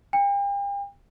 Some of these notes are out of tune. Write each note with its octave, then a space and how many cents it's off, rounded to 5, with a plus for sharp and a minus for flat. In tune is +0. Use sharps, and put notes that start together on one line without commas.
G5 +40